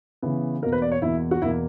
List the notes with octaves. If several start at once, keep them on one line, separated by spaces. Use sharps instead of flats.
C#3 E3 B3
E2 B2 A#3 A#4
B4
D5
C#5
E2 B2 A#3 E4
F#4
E2 B2 A#3 E4